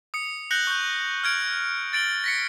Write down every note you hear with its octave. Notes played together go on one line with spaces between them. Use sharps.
D#6 C#7
F#6 G6 A#6 C#7 F#7
C#6 G6
F6 G#6 D7 F#7
A6 D7 F#7 G7
A#6 B6 C#7